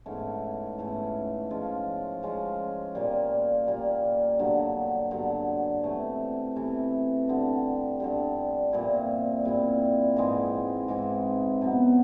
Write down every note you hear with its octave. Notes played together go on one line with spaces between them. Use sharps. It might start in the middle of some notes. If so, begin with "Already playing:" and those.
G#2 E3 A3 C#4
G#2 E3 A3 C#4
F3 G#3 C#4 F4
F3 G#3 C#4 F4
A#2 G3 A#3
A#2 G3 A#3
G2 D3 F#3
G2 D3 F#3
C3 E3 A3
C3 E3 A3
G2 D3 G3
G2 D3 G3
A#2 G3 C4 E4
A#2 G3 C4 E4
G#2 E3 G#3 C4
G#2 E3 G#3 C4
B2 F#3 B3